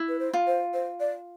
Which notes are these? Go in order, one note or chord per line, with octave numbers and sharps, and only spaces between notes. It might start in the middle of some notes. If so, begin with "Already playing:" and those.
Already playing: E4
B4
C5
F4
C5
C5
D5